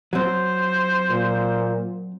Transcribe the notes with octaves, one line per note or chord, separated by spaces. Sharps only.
F#3 C4 C5
A#2